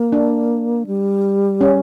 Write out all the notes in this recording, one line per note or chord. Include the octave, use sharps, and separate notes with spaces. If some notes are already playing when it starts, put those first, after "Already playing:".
Already playing: A#3
D4
G3
C#4